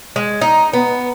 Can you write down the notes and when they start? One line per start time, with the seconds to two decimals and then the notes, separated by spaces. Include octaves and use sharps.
0.16 G#3
0.41 D#4
0.73 B3